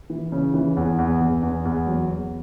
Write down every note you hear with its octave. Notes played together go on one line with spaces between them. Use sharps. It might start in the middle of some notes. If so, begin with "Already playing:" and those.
E3
C#3
E3
E2
E2
E2
E2
E2
F#3
E2